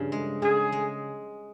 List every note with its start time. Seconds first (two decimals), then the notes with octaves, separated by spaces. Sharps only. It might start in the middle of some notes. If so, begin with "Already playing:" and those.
Already playing: G2 C#3 F3
0.12 G#3
0.42 C#3 G#4
0.72 G#3